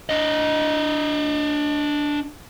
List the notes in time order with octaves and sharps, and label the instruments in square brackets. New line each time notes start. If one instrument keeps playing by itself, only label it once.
[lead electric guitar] D4 D#5